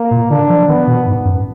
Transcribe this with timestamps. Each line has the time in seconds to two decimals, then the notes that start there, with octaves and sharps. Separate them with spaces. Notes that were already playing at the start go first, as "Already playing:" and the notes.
Already playing: A#3
0.11 A#2
0.30 D3 D4
0.49 F3
0.68 D#3 B3
0.87 B2
1.07 G#2
1.25 F#2